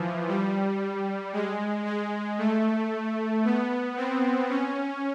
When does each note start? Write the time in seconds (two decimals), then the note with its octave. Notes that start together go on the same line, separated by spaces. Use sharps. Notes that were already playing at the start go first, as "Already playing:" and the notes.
Already playing: E3 F3
0.28 G3
1.33 G#3
1.86 G#3
2.38 A3
3.44 B3
3.96 C4
4.49 C#4